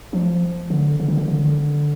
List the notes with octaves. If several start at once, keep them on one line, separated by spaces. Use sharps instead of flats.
F3
D3
D3
D#3
D3
D3